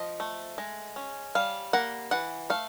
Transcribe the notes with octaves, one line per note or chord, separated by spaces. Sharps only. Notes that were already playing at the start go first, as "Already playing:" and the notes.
Already playing: F3 D#5
A3
G#3
C#4
G3 F5
A#3 F#5
E3 F#5
A3 F5